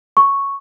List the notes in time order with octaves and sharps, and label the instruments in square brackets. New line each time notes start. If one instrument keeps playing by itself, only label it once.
[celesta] C#6